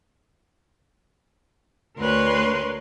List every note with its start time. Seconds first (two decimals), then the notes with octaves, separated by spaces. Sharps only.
1.98 D2 A#4 B4 C#5 C6